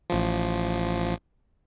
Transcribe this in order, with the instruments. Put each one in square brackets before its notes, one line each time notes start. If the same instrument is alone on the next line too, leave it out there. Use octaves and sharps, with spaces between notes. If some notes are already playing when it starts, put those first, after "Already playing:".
[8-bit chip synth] A1 F3